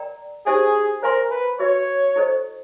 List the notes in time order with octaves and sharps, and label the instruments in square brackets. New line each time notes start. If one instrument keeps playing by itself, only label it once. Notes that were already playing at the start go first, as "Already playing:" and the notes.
Already playing: [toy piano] A#4 D5 G5 A#5
[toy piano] D#4 G4 C5 E5 G#5 [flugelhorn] G#4
[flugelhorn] A#4 [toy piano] C5 F5 G#5 C6
[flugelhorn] B4
[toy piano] F#4 B4 E5 [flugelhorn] C#5
[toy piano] E4 A4 C5 D#5